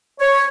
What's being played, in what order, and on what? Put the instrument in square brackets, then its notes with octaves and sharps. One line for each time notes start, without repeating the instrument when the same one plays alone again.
[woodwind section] C#5